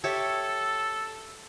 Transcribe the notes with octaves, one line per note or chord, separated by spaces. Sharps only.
G4 A4 C#5 E5